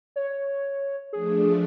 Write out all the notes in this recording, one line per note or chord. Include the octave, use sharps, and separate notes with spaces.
C#5
F3 A3 D4 G#4